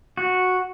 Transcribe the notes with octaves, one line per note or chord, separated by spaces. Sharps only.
F#4